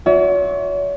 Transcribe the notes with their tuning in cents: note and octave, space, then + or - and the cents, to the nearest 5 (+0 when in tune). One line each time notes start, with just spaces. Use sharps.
F#4 -40 C#5 +45 E5 -35